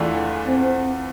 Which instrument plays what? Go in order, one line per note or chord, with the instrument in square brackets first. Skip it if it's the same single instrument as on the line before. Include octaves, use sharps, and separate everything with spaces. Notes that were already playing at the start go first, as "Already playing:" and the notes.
Already playing: [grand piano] E2 E3 A3 D4 F4
[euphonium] C4